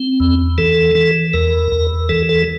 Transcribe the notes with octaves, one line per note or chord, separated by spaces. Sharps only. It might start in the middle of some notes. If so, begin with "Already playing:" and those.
Already playing: C4
E2
E3 A4
E3
E2 A#4
E2
E3 A4
A4